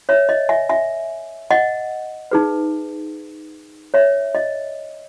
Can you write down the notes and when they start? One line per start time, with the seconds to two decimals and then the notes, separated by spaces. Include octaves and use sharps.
0.09 C#5 E5
0.29 D#5
0.49 E5 G#5
0.69 E5 G#5
1.51 D#5 F#5
2.31 D#4 G#4 B4
3.94 C#5 E5
4.35 D#5